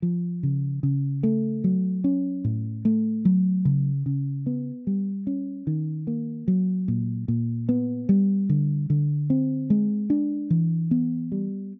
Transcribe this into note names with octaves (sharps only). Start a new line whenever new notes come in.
F3
C#3
C#3
A3
F#3
C#4
A2
A3
F#3
C#3
C#3
B3
G3
C#4
D#3
A#3
F#3
A#2
A#2
B3
G3
D3
D3
C4
G#3
D4
E3
B3
G3